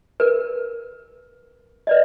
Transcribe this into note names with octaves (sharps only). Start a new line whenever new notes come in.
A#4 B4
B4 D5 D#5